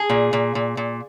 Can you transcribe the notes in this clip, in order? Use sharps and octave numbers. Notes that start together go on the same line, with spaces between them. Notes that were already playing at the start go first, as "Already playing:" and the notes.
Already playing: G#4
A#2
A#2
A#2
A#2